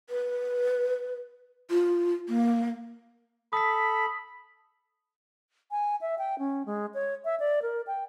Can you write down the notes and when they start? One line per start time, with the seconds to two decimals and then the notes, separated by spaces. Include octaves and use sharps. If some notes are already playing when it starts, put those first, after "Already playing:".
0.10 B4
1.70 F4
2.29 A#3
3.53 A4 B5 D#6 B6
5.71 G#5
6.01 E5
6.18 G5
6.39 C#4
6.66 G#3
6.94 C#5
7.25 E5
7.40 D5
7.62 A#4
7.87 G5